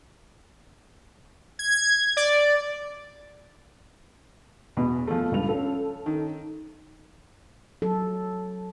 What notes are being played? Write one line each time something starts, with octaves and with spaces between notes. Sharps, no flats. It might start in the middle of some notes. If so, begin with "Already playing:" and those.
G#6
D5
E2 B2
F3 A3
C#2 G2 F7
C#4 A4
D#3
F#3 A4